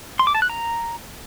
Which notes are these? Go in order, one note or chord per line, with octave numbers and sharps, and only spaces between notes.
C6
D6
A5
F#6
A#5